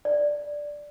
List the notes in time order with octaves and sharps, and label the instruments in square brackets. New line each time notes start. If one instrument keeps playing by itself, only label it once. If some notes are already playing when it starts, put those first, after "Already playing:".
[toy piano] D5